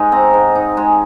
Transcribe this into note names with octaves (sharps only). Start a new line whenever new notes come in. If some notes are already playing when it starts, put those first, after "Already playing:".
Already playing: G#2 G#3 D#4
C4 A#5
G#2
D#4
G#3